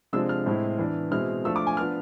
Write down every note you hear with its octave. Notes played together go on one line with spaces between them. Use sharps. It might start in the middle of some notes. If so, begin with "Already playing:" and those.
C3 F3 G#3 D4 E6
F6
A2 G#3 C4 E4
E3 B3 D4
B2 G#3 C4 E4 F6
F3 A3 D4 E6
D6
G#5
F3 B3 D4 F6